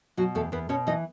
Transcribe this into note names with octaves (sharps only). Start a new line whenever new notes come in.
B2 F#3 F#4
E2 A3 A4
E2 B3 B4
B2 C#4 C#5
E3 D#4 D#5